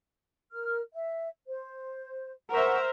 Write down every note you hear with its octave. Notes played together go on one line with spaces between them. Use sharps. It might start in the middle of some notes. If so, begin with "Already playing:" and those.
A#4 F6
E5
C5
A#4 C5 E5 F#5 A#5 C#6